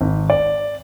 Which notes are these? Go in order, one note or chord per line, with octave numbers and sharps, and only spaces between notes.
G#1
D5